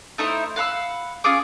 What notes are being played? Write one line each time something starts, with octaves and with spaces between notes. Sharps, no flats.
A3 D#4 E4 C5
F5 F#5 B5 E6
C#4 F4 G#4 D6